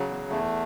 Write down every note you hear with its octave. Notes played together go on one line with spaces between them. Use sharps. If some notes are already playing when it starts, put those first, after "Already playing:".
Already playing: C#3 F#3
E2
E2 A3